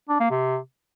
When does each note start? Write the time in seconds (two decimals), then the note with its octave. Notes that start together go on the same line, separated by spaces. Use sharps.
0.09 D4
0.20 A#3
0.31 C3